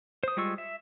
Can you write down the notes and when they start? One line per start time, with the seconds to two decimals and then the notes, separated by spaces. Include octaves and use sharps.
0.23 C5 D#6
0.37 G3 G#3 F4 C#6 E6
0.58 E5